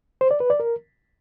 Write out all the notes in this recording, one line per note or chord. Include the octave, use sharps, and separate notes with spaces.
C5
D5
B4
D5
A#4